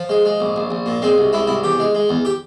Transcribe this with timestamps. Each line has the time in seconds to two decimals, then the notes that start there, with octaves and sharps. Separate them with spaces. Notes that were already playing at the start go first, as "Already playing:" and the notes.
Already playing: F3
0.09 G#3
0.25 G#3
0.40 A#1
0.56 A#1
0.70 A#1
0.86 A#2
1.02 G#3 C4
1.18 C2
1.33 G#3 E4
1.47 C2 E4
1.64 E2 G4
1.79 G#3
1.95 G#3
2.09 E2
2.25 G4